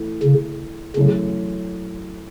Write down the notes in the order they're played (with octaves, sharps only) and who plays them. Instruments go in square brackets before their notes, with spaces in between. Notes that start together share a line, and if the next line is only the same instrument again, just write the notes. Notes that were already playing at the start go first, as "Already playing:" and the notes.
Already playing: [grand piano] E3 A3
[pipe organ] C#3
[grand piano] F#2 E3 A3 [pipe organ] C#3